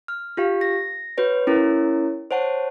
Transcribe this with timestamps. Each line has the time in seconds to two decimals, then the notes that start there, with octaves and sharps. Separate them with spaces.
0.08 F6
0.37 F4 G4 F5
0.61 A#6
1.18 F#4 B4 C#5
1.47 C#4 E4 A#4 C#5
2.31 C5 C#5 F#5 A5